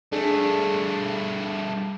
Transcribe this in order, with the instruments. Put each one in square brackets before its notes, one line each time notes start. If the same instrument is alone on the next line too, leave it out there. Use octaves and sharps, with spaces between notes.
[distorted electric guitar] G2 A3 [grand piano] D4 G#4 A4